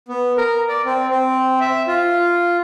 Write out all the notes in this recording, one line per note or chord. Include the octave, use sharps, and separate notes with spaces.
B3
A#4
D5
C4
C4
E5
F4